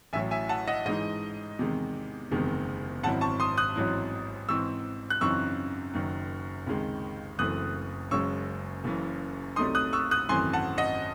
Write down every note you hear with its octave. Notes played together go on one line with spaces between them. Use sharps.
A1 A2 F#3 E5 G#5
E5 G#5
F#5 A5
D#5 F#5
G#2 E3 G#3 D#4 D#5
E2 C3 D#3 G#3
F#1 E2 C3 D#3 G#3
G#1 G#2 F#3 C4 E4 F#5 A5
A5 C#6
C6 D#6
D#6 F#6
A1 G#2 F#3 C4 E4
G#2 E3 C4 C#6 E6
F#6
F#2 C#3 E3 C4 D#4 C#6 E6
F#1 F#2 D#3
C#2 C3 D#3 G#3
F#1 F#2 E3 A3 C4 D#6 F#6
F#1 F#2 C#3 G#3 C#4 C#6 E6
F#1 F#2 C#3 E3
C2 C3 F#3 A3 D#4 C6 D#6
D#6 F#6
C#6 E6
D#6 F#6
G#1 F#2 E3 A3 C4 G#5 C6
F#5 A5
D#5 F#5